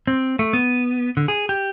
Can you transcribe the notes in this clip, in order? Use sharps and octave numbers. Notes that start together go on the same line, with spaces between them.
C4
A3
B3
D3
G#4
G4